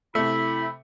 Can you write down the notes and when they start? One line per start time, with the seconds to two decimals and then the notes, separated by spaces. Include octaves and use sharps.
0.15 C3 A3 E4 E5 B5